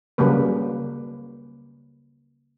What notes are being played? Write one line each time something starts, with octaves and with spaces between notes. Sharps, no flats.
C#3 F#3 G3 A#3 B4